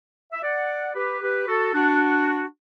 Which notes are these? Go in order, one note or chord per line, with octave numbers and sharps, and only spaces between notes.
E5
D5 F#5
G4 B4
G4 B4
F#4 A4
D4 F#4